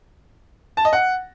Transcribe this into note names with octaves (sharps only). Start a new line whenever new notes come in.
A5
D#5
F#5